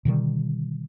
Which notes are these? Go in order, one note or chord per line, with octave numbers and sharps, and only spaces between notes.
B2 D3 D#3 G3